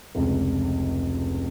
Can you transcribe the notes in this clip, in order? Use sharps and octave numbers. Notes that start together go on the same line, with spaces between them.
F1 C#2